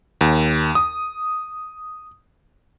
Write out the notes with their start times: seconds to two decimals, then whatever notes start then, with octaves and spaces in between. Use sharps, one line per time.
0.21 D#2
0.75 D#6